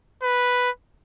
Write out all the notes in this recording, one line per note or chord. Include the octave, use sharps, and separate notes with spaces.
B4